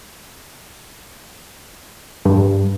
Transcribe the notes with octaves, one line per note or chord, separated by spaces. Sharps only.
G2